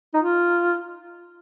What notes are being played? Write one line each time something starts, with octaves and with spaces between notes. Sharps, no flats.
D#4
F4